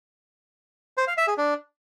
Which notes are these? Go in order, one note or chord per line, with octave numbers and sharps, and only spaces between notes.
C5
F5
E5
G#4
D4